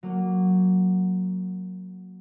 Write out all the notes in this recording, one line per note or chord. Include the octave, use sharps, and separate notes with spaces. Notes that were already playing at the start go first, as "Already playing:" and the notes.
F#3 A#3